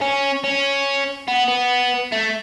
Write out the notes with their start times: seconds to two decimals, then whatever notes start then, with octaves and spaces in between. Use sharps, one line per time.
0.01 C#4
0.44 C#4
1.28 B3
1.48 B3
2.12 A3